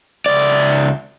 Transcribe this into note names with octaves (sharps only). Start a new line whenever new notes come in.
C#2 D5